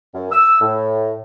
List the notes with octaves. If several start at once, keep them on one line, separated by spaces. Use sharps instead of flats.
F#2
E6
A2